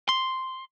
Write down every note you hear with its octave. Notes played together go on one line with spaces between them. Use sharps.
C6